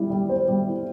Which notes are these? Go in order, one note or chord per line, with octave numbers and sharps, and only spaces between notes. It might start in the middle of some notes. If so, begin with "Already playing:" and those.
Already playing: G3 E4
G3
C5
G3
E4